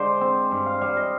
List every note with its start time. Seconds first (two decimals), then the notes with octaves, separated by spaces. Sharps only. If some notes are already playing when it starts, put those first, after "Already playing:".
Already playing: D3 G#3 C5 D5
0.21 C4
0.51 G2
0.66 F5
0.81 G3 F5
0.97 D#5